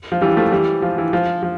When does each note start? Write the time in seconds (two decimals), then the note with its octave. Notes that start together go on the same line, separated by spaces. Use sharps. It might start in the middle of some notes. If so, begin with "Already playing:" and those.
0.12 F3
0.21 E3 G3
0.37 F3 A3
0.52 E3 G3
0.82 F3
0.98 E3
1.13 F3
1.43 F3